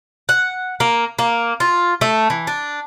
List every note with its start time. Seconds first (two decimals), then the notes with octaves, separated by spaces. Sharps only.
0.29 F#5
0.80 A#3
1.19 A#3
1.60 F4
2.01 A3
2.30 E3
2.47 D4